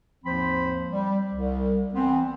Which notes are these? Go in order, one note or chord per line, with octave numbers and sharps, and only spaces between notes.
D#2 G#2 F3 C4 C5 B5
G3
C2
E3 B3 C4